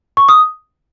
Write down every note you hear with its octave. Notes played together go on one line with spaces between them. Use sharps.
C#6
D#6